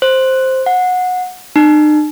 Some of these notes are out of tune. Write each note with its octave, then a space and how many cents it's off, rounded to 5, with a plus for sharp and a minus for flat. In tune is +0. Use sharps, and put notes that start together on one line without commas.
C5 +5
F#5 -20
D#4 -45